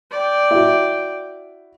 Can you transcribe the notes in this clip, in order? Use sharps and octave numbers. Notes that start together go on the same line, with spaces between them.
D5 G5
E4 F#4